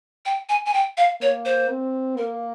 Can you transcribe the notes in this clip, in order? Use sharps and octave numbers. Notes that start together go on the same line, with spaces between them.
G5
G#5
G#5
G5
F5
A#3 C#5
C5
C4
A#3 A#4